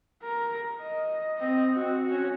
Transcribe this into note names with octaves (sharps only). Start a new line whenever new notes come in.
A#4
D#5
C4 D#5
C4 F#4
C#4 F#4